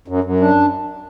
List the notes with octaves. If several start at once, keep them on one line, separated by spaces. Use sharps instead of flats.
F#2
F#2
D4